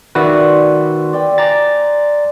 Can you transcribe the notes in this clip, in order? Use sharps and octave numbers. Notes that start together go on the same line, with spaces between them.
D#3 F#4 B4 D5 E5
C5
D5 G5 D#6
D5 G#5 A#5 A6